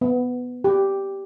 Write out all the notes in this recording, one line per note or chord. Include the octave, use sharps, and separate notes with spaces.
B3
G4